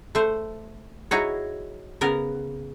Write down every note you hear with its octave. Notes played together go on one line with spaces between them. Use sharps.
A3 C5
D#4 E4 F#4 G#4 C#5
C#3 B3 A#4